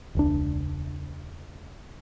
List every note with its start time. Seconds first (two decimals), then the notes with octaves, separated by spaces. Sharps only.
0.15 E1 C#2 D4